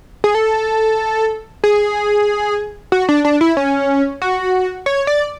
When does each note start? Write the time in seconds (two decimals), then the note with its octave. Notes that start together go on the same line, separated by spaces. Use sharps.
0.24 G#4
0.35 A4
1.64 G#4
2.92 F#4
3.09 D4
3.25 D4
3.41 E4
3.57 C#4
4.22 F#4
4.86 C#5
5.07 D5